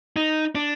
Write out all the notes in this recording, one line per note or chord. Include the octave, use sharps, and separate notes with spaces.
D#4
D4